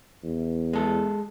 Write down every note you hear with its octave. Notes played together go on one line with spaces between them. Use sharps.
E2
G#3 A4